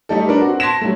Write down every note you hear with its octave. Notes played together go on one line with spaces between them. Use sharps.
G3 A3 D#4 G4 A4
D4 A#4 B4
C4 F#4
A5 C6 G#6 A#6 B6 E7
F#3 G3 A3